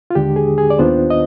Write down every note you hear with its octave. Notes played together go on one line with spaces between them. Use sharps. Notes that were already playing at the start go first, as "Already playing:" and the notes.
F4
D#2 D3 G#3 D4 G4
G#4
G#4
D5
D#2 D#3 B3 D4 F4 C5
D#5